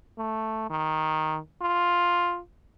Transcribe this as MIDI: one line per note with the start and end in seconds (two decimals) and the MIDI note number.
0.18 0.66 57
0.70 1.39 51
1.62 2.40 65